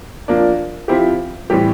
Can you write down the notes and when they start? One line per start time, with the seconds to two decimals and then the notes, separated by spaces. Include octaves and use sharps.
0.28 F3 A#3 D4
0.88 F3 C4 E4 G4
1.50 A2 E3 G3 C4 G4